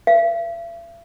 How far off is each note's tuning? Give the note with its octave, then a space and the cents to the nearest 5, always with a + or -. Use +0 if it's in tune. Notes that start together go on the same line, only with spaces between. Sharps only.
E5 +45